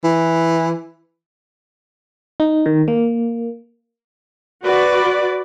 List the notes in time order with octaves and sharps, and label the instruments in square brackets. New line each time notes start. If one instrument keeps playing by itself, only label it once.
[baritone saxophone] E3
[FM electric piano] D#4
D#3
A#3
[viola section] F#4 B4 D5